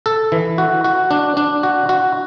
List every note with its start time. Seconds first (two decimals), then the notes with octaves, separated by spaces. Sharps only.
0.06 A4
0.32 E3
0.58 F#4
0.84 F#4
1.11 D4
1.37 D4
1.63 F#4
1.89 F#4